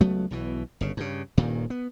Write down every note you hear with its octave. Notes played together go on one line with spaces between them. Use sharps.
C#2 F#3 A3 B3
B1 B2 E3
G1 C#3
G2 C#3
D#1 G2 A#2 D#3
B3